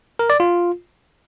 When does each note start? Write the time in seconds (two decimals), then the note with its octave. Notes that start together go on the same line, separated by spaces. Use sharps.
0.19 A#4
0.30 D5
0.40 F4